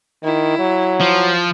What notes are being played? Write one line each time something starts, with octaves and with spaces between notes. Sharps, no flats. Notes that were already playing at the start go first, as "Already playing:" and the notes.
D#3 E4
F#3
F3